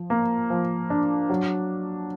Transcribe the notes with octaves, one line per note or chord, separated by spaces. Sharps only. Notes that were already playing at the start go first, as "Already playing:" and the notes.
Already playing: F3
A#3
F3
D4
F#3